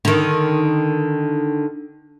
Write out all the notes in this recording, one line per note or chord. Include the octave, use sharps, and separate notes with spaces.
D3 D#3